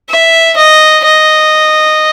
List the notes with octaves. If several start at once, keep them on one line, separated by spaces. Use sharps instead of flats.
E5
D#5
D#5